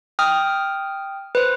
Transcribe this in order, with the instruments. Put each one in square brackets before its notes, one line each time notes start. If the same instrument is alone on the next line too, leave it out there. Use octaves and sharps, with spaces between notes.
[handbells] G5 D#6 F6
B4 C5